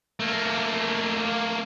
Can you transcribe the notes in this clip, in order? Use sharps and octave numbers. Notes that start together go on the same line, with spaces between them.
A3 A#3